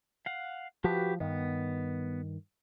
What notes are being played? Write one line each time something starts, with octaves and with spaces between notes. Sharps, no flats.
F5 F#5
F3 F#4 G4 B4
G2 D#3 B3